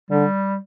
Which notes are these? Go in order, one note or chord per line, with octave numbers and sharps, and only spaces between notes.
D3 G3